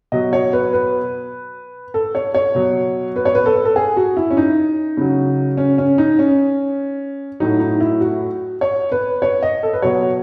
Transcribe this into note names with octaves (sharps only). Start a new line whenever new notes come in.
B2 F#3 D#5
C#5
B4
B4
A4
C#5
C#5
B2 F#3
B4
C#5
B4
A4
A4
G#4
F#4
E4
C#4
D#4
C#3 F#3
C#4
C#4
D#4
C#4
A2 F#3 D#4
D#4
E4
F#4
C#5
B4
C#5
D#5
A4
B4
B2 F#3 C#5